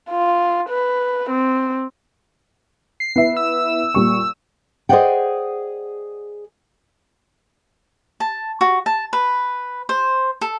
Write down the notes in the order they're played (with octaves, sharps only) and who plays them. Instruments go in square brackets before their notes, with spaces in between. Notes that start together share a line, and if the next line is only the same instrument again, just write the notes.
[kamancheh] F4
B4
C4
[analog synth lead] C7
[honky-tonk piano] B3 E4 E5
[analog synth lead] E6
[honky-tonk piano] A#2 G3 C#6
[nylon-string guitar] G#4 C5 D5 D#5 F#5 G5
[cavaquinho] A5
F#4
A5
B4
C5
A4